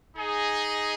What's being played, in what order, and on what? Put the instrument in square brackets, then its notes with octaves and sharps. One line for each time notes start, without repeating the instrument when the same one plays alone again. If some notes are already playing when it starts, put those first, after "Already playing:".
[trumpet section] D#4 G#4 D#5